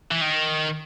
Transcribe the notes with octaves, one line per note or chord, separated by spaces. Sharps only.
E3
D#3